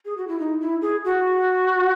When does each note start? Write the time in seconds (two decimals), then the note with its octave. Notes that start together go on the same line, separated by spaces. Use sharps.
0.05 G#4
0.17 F#4
0.28 E4
0.39 D#4
0.61 E4
0.82 G#4
1.04 F#4